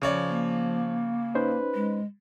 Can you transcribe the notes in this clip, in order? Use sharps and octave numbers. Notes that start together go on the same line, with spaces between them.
C#3 F3 C#5 D5
A#3
C#4 D#4 B4 C5
G#3